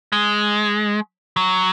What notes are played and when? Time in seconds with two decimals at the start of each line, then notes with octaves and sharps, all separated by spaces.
0.12 G#3
1.36 F#3